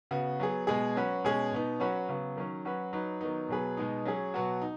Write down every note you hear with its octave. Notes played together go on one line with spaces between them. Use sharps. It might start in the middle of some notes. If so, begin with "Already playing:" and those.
C#3 B3 F#4
F#3 B3 G#4
B2 G#3 B3 G#4
F#3 C#4 F#4 B4
B2 G#3 C#4 G#4
B2 B3 D#4
F#3 C#4 F#4 B4
C#3 F#3 B3
D#3 F#3 C#4
F#3 C#4 F#4 B4
F#3 D#4 B4
D#3 F#3 B3 D#4
B2 F#3 B3 G#4 B4
B2 G#3 B3 D#4
F#3 C#4 G#4
B2 F#3 B3 F#4
D#4